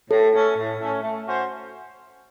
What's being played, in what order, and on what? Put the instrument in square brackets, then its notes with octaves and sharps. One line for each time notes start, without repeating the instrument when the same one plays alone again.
[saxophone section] A2 [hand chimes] A4
[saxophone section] A3 C#4
A2
A3 C#4
A3
C#4 F#4 C5